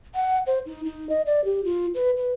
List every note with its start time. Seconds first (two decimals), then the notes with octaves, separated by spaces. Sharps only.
0.15 F#5
0.47 C5
0.66 D#4
0.85 D#4
1.09 D#5
1.26 D5
1.45 G4
1.65 F4
1.95 B4
2.17 B4